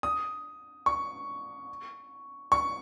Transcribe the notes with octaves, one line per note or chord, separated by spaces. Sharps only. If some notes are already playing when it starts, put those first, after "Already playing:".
D#6
C#6
C#6